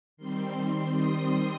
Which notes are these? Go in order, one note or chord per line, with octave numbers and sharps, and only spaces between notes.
D#3 G3 C4 C6
D#6